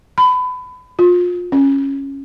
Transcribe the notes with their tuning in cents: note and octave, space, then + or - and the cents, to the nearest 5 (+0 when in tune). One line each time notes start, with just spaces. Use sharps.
B5 +25
F4 +25
C#4 -10